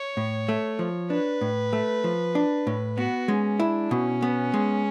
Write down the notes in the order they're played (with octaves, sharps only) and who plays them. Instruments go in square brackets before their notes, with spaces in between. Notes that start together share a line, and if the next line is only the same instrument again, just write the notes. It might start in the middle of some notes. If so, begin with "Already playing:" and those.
Already playing: [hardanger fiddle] C#5
[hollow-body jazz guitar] A2
A3
F3
[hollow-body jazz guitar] D4 [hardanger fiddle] B4
[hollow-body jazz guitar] A2
A3
F3
D4
A2
[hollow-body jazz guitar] B3 [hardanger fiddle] F#4
[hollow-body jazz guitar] G#3 [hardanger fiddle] C#4
[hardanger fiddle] D4 [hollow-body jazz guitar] E4
[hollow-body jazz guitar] B2 [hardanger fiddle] C#4
[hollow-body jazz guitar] B3
G#3